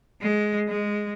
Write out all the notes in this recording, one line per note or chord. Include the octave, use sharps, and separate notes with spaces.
G#3
G#3